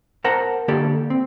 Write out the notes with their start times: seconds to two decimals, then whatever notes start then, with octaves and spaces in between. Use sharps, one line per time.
0.24 A#4 C5 F#5 A5 A#5
0.68 D3 A#3 G4 A4 D5
1.10 C4